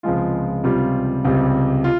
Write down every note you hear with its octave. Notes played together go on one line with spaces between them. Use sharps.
C#2 C3 F3 G#3 F4
C#2 C3 G3 F4
C#2 C3 G3
F4